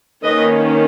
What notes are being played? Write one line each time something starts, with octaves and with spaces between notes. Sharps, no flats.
D#3 A#3 C#4 B4 D#5